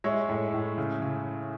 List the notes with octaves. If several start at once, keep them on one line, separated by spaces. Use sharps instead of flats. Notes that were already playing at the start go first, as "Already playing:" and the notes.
G#3 C#5 E5
A2
A2
C#3
C#3